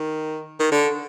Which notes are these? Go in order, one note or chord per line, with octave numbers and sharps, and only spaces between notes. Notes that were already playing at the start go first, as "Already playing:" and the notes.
Already playing: D#3
D#3
D3